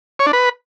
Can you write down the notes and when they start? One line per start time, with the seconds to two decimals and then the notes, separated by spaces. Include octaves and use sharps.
0.19 C#5
0.26 D4
0.33 B4